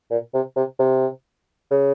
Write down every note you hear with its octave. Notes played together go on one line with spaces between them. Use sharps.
A#2
C3
C3
C3
C#3